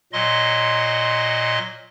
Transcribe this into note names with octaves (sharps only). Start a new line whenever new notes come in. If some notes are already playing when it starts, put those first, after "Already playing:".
A#2 F#3 D#5 C6